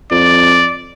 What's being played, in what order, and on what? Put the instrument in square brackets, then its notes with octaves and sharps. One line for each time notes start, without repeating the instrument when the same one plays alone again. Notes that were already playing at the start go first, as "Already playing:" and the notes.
[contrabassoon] F2 [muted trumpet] D5